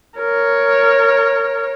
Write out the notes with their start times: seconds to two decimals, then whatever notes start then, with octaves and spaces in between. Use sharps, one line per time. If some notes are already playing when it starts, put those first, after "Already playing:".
0.18 A#4 C#5